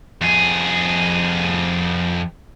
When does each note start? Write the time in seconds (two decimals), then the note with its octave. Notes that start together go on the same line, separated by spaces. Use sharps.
0.21 F2 G#4